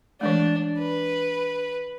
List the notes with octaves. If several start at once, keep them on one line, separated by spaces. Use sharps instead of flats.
E3 G#3 A3 D4
B4